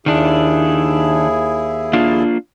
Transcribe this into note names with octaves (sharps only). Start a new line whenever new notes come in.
D#2 D#3 D4 E4 G#4
A#3 D4 F4